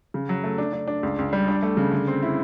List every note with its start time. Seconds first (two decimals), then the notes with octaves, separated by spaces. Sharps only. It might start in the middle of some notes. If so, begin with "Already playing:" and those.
0.14 C#3
0.29 F#3
0.44 A3
0.58 D4
0.73 D4
0.88 D4
1.03 C#2
1.18 C#2
1.33 G3
1.48 D4
1.63 A3
1.77 C#3
1.92 D3
2.08 C4
2.23 E4